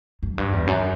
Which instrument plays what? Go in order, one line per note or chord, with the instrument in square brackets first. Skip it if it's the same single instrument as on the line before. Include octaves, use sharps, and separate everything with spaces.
[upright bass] F#2
G2
E2
F#2